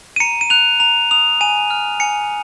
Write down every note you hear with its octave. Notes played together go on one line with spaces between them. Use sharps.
D#7
A#5 C#7
D#7
F#6 F7
A#5 F7
D#6 F7
G#5 D#7
F6
G#5 C#7